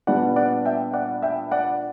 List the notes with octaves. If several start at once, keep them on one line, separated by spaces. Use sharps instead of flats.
A#2 G3 B3 D4 D5 F#5
D5 F#5
E5 G5
D5 F#5
E5 G5
D5 F#5